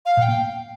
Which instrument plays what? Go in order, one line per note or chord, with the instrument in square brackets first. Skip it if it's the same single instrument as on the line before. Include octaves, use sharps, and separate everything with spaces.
[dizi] F5
[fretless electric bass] A#2 [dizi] G5
[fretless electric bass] A#3